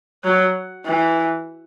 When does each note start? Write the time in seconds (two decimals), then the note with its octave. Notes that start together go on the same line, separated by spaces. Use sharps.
0.24 F#3
0.86 E3